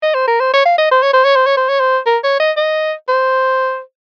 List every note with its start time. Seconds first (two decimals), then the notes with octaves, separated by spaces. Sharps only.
0.03 D#5
0.14 C5
0.28 A#4
0.40 C5
0.53 C#5
0.65 F5
0.78 D#5
0.91 C5
1.02 C#5
1.13 C5
1.24 C#5
1.36 C5
1.46 C#5
1.57 C5
1.69 C#5
1.80 C5
2.06 A#4
2.24 C#5
2.40 D#5
2.57 D#5
3.08 C5